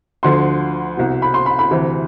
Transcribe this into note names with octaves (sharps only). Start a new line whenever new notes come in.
D2 D3 F3 C6
C2 B2
B5
C6
B5
B5
D2 C3 E3